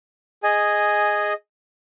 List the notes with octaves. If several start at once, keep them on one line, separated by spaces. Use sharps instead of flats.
G#4 D#5 G#5